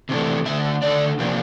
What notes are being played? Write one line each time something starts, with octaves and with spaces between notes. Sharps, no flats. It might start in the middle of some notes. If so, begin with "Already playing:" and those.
C3 E3 A3 D4
D3 A3 D4 E5
D3 A3 D4 D5
C3 F3 A#3 D4